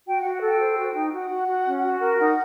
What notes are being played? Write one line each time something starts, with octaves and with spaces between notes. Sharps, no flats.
F#4 G5
F#5
F#4 F5
F#5
A4 G5
C5
F#4
D#4
F#4 F#5
F#4
F#4
C#4
F#4
A#4
D#4 F#5